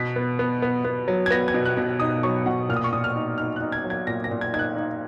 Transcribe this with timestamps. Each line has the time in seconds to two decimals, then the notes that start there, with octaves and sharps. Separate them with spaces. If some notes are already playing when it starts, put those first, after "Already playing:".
Already playing: B2 B6
0.16 B3
0.39 B3
0.62 B3
0.85 B3
1.08 F#3
1.26 G#6
1.30 B3 A#6
1.48 G#6
1.54 B2
1.65 F#6
1.77 B2
2.00 D#4 D#6
2.23 F#3 C#6
2.46 B2 F#5
2.69 A#2 F6
2.76 D#6
2.84 C#6
2.93 A#2 D#6
3.04 F6
3.15 D#4
3.38 D#4 F6
3.56 D#4 F#6
3.72 G#6
3.84 F#3
3.90 G#6
4.07 A#2 A#6
4.24 A#6
4.31 A#2
4.41 G#6
4.53 D#4 G#6
4.59 F#6
4.76 D#4